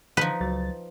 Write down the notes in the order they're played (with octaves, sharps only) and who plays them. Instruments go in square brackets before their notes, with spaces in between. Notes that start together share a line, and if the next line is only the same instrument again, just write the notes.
[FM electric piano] D3 E3 [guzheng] F3 D#4 [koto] B4
[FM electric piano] C#2 F#3 A6